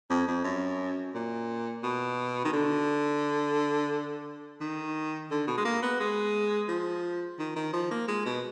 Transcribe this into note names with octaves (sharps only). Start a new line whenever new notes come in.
F2
F2
F#2
A#2
B2
D#3
D3
D#3
D3
B2
G#3
A#3
B3
G#3
F3
D#3
D#3
F3
A#3
G#3
B2